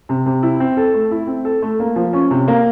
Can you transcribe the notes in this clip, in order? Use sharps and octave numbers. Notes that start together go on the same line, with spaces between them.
C3
C3
E4
C4
A4
A3
E4
C4
A4
A3
A#3
F3
C#4
C3
A#3